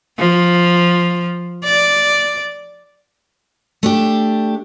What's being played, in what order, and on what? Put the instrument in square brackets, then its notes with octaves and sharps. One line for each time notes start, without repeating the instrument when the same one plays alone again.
[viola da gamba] F3
D5
[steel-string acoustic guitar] A3 D4 G4